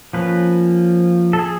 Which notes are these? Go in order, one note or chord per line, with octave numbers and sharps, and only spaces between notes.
F3 A#3 C#4 B4
A4
G#4